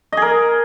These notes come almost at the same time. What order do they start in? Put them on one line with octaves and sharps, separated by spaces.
D#5 G#4 A#4